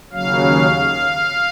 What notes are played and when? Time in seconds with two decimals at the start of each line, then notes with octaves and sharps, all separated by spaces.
0.13 D#2 C#3 F#3 F5